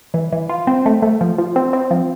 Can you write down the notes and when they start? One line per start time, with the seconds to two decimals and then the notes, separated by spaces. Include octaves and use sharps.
0.14 E3
0.32 E3
0.49 F4
0.67 C4
0.86 A3
1.02 A3
1.21 F3
1.38 F3
1.56 C4
1.73 C4
1.91 F3